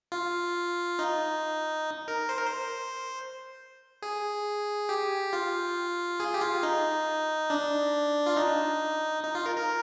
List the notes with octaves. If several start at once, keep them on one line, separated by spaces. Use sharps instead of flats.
F4
D#4
A#4
C5
A#4
C5
G#4
G4
F4
G#4
G4
F4
D#4
D4
F4
D#4
D#4
F4
A#4
A#4